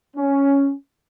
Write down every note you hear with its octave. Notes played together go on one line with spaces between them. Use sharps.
C#4